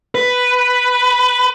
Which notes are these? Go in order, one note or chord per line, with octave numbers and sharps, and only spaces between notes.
B4